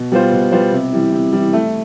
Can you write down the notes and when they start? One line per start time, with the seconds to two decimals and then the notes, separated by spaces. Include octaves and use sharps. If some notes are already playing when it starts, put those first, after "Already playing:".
Already playing: B2
0.12 G3 B3 F4 C5
0.32 B2
0.52 G3 B3 F4 C5
0.72 C3
0.93 E3 G3
1.12 C3
1.32 E3 G3
1.53 A3